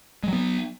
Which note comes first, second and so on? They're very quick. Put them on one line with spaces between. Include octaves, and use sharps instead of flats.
G#3 F#3 B3